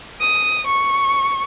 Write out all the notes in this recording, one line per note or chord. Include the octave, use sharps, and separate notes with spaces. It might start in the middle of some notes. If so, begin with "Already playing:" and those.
D#6
C#6